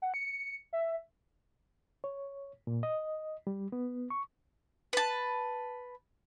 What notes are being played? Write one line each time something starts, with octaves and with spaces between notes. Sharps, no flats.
F#5
C#7
E5
C#5
A#2
D#5
G3
B3
C#6
B4 A5